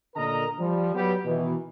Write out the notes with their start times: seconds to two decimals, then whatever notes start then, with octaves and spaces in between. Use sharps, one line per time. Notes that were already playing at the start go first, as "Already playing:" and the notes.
0.16 A#2 D3 A#4 D#5 A#5
0.59 F3 G3
0.94 F#3 G3 B3 G4
1.25 B2 D#3 E3